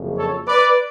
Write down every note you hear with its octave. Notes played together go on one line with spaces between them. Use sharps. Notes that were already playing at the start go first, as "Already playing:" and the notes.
Already playing: F#1 F2 C#3
A4 C#5
B4 D5